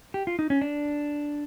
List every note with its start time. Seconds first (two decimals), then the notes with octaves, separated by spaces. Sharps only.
0.14 G4
0.27 F4
0.39 D#4
0.50 C#4
0.61 D4